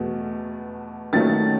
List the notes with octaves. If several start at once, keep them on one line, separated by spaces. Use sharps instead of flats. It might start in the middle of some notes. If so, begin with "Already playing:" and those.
Already playing: E2 B2 A3
D#3 F#3 A3 C#4 A6